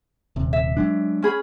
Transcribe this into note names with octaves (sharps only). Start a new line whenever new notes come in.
D#1 C3
E5
F#3 G#3 D4
C#4 G#4 B5